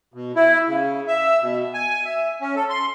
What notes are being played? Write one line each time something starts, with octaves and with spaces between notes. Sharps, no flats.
B2
E4
C#3
E5
B2
G#5
E5
C#4
A4
C6